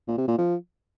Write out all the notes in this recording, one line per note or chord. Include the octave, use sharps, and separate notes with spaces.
A#2
C3
A#2
F3